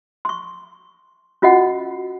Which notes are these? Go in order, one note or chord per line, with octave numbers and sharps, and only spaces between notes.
C6 C#6
C#4 F4 F#4 D#5 F#5